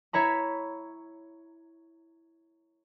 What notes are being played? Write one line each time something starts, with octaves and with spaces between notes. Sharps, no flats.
E4 C#5 A#5 B5